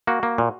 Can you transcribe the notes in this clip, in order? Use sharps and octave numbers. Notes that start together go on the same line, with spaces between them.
A#3 F#4
A#3
A#2